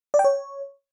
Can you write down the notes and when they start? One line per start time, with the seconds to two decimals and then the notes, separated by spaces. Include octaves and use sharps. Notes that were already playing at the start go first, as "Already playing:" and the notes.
0.14 D5
0.19 G5
0.24 C#5